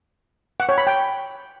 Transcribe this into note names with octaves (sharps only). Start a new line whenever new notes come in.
F#5
C#5
B5
G5